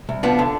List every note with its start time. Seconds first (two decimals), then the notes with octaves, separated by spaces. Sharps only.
0.09 C2
0.23 F3 B3 D4
0.39 D3